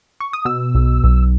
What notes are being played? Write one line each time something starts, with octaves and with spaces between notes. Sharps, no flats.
C#6
D#6
B2 E6
B1
B1